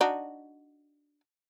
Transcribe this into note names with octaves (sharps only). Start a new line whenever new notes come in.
D4 D#4 F#4